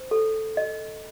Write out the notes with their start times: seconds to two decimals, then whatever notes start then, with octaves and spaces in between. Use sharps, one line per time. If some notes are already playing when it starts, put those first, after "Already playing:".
Already playing: C5
0.11 A4
0.57 D#5